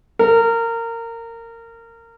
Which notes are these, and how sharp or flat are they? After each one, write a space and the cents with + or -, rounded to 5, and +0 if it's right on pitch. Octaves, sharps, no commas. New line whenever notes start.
A#4 -20